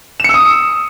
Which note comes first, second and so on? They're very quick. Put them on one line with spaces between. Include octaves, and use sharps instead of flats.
E7 C#7 E6 D#6